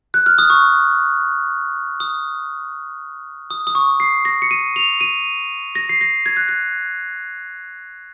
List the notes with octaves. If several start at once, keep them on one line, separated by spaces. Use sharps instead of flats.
F#6
F6
D#6
C#6
D#6
D#6
D#6
C#6
C7
A#6
C#7
D#7
F7
D#7
A#6
C7
A#6
G#6
F#6
G#6